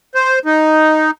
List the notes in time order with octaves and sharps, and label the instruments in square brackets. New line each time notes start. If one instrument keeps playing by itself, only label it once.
[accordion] C5
D#4